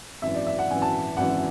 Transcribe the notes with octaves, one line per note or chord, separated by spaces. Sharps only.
G#1 F#2 E3 E5
D5
E5
F#5
G#1 F#2 E3 G#5
A5
G#1 F#2 E3 F#5